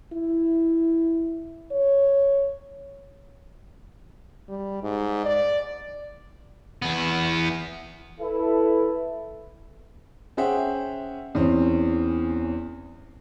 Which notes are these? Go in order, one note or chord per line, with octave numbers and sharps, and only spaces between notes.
E4
C#5
G3
G#2
D5
E2 B3
E4 A4 B4
C#4 G#4 C5 E5 F#5 G5
E2 C4 C#4